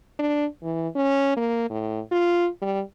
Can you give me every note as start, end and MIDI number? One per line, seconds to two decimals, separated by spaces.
0.19 0.46 62
0.63 0.88 52
0.96 1.34 61
1.37 1.65 58
1.70 2.00 45
2.12 2.48 65
2.62 2.81 55